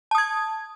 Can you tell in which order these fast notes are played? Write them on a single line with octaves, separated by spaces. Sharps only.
A5 D#6 G#6